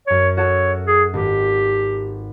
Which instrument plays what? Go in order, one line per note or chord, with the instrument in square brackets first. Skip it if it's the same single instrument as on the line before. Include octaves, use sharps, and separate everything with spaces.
[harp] F#2 G#6 [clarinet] C#5
[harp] F#4 A4 [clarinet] C#5
[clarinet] G#4
[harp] G#1 [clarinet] G4